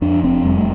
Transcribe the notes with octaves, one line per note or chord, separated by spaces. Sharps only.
F2 D4
F1 C4
F1 G3
A3